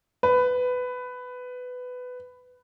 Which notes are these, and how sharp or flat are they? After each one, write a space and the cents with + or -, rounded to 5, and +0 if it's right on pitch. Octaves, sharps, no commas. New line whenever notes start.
B4 +15